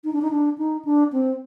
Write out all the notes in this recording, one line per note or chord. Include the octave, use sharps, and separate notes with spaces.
D#4
D4
D#4
D4
D#4
D4
C4